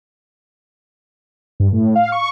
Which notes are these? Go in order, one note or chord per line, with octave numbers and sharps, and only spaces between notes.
G2
A2
F5
C#6